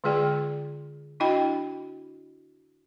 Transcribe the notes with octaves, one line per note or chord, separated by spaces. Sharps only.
D3 G#3 F4 G#4 D5 G5
D4 E4 F#4 D#5 G5 B5